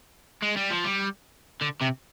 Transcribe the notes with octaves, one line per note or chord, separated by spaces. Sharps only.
G#3
G3
F3
G3
D3
C3